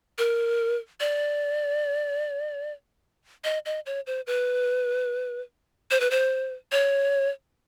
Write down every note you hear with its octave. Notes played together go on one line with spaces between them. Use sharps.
A#4
D5
D#5
D#5
C#5
C5
B4
C5
B4
C5
C#5